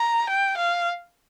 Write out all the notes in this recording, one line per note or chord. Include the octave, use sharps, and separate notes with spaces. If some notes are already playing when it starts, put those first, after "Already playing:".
Already playing: A#5
G5
F5